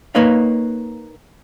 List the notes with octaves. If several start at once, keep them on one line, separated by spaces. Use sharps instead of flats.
A#3 D#4 B4 C#5 D#5 F5